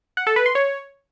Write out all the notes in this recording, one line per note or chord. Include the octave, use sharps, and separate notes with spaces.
F#5
A4
B4
C6
C#5